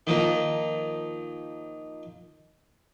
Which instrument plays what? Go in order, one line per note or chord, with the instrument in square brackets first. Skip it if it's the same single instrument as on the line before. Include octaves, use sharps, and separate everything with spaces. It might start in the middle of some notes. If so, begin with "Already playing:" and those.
[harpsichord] D#3 F3 A#3